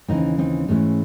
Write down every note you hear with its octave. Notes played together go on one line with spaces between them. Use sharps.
D#2 C#3 E3 C4 D#4
C4 D#4
G#2 E3 G#3 A3 C#4